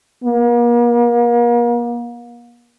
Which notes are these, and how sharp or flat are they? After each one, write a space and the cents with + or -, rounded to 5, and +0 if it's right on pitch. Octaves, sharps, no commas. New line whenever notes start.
A#3 +40